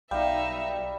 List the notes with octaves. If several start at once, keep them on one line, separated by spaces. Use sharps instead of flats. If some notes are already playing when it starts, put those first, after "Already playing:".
B1 G3 D#4 E5 F5 G5